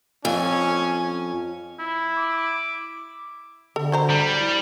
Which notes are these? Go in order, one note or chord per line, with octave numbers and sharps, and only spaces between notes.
F2 C#4 G#5
E4
D6
D3 A4
F#3 C5 A#5
G3
E4